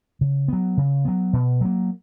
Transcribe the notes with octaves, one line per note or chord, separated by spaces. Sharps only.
C#3
F#3 B3
C#3
F#3 B3
B2
F#3 A#3